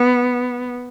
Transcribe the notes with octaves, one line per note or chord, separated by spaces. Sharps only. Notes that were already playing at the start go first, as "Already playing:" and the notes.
Already playing: B3